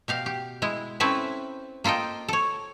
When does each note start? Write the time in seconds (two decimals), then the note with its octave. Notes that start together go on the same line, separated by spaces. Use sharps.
0.08 B2 G4 F5
0.26 G4
0.62 G#3 E4
1.00 C4 C#4 E4 A4 B4 E5
1.84 A#3 F4 A4 D#5 G5
2.28 A4 C#5